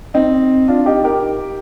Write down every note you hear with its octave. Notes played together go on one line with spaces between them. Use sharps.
C4 D#4
D4 F4
D#4 G4
G4 A#4